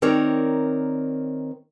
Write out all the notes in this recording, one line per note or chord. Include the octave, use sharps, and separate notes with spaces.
D#3 C4 A#4 C#5 D5